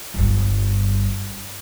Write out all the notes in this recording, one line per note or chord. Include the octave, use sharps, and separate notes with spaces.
G1 G2